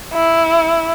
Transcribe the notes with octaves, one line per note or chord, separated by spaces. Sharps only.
E4